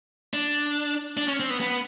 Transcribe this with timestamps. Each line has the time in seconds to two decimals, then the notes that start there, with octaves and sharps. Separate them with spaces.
0.34 D4
1.17 D4
1.28 C#4
1.40 C4
1.50 B3
1.61 B3